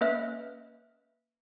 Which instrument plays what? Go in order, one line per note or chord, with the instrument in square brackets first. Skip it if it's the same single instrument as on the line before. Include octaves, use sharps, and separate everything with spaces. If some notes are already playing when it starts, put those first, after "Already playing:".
[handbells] A#3 C#4 B4 D#5 E5 F6